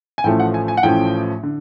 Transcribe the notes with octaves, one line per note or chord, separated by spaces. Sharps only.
G#5
A1 A2 F3 A3 C#4 G5
F#5
G#5
G#5
F#5
A1 A2 F3 A3 C#4 G5
D3